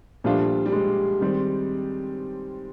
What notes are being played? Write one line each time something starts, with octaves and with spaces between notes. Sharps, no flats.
A#2 F3 G3 A3 D4 F4
G3
G#3
D#3 G3 C4